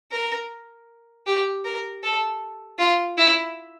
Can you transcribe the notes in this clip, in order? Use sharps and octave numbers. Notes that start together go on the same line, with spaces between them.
A#4
G4
A#4
A4
F4
E4